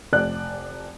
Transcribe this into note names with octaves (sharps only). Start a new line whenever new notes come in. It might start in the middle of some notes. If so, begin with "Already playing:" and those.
F1 D5 F#6